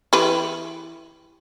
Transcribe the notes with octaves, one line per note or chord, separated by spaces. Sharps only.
E3 G4 B4